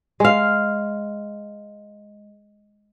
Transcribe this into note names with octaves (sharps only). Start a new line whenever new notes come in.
G#3 F5